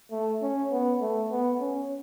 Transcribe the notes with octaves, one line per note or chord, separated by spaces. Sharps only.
A3
C#4
B3
A3
B3
C#4